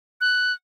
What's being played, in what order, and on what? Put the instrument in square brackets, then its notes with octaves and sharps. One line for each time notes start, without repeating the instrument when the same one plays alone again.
[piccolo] F#6